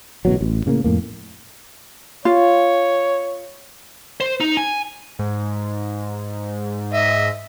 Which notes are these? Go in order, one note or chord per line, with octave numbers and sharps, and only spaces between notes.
A1 B2 F#3
A1
A2 C#3 A3 A#3
F2 A2 A#3
F4 C#5
C5
D#4
G#5
G#2
D#5 E5